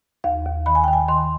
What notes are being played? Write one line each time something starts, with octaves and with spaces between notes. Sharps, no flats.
D#2 F5
D#2
D#3 B5
G#5
G5
D#3
G#5
D#3 C6